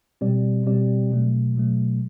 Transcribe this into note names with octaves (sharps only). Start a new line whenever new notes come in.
B2 G3 C4 G4 D5
B2 G3 C4 G4 D5
B2 F#3 A3
B2 F#3 A3